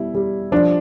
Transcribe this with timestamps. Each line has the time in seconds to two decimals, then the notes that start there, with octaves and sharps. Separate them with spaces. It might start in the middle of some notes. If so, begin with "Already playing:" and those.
Already playing: B2 G3 E4
0.15 G3
0.52 F3 D4